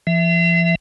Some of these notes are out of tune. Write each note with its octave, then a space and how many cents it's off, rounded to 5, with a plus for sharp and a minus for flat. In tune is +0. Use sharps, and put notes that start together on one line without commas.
F3 -40 E5 +0